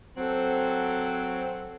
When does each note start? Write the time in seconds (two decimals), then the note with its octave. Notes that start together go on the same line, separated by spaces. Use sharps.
0.17 F#3 C4 A4 F#5